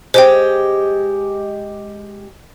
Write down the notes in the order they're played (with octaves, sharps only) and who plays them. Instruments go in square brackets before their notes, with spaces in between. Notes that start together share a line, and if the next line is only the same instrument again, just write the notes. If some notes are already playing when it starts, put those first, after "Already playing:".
[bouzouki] G#3 G4 [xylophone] C5 G5